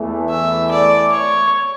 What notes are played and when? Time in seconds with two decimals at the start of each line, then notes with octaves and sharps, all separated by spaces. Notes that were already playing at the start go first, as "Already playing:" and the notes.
Already playing: E2 E3 A3
0.29 E5
0.70 D5
1.11 C#5